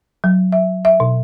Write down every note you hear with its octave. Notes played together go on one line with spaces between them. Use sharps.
F#3
E5
E5
B2